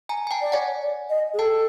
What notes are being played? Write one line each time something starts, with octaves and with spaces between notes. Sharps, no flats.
G#5 A#5
G#5
G5 A5
D5
C#5 F#5 G#5
D5
D#5
G#4
A4 G5 A5